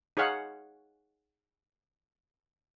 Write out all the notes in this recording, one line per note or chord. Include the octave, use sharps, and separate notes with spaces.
D#4 G#4 C#5 F5 F#5